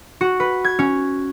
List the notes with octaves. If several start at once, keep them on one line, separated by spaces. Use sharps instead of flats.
F#4
B4
G#6
C#4